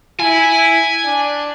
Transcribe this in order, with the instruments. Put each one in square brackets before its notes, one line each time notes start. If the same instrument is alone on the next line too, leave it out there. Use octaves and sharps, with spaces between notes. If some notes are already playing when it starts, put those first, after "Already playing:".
[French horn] E4 [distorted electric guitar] G#5
[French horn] D4